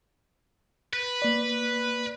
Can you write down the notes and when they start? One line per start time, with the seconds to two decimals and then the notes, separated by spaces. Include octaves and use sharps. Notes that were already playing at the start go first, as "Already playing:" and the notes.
0.93 B4
1.22 A#3 D5